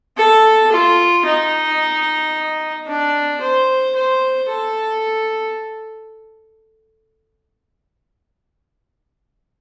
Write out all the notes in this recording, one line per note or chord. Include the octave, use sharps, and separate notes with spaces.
A4
F4
D#4
D4
C5
C5
A4